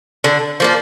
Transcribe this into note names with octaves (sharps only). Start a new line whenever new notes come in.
D3
F3 A#3 D4